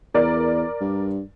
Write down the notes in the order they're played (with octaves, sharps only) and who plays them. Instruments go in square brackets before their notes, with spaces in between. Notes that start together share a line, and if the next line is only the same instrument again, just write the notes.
[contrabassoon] E2 [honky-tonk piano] A#4 D5
[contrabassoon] G2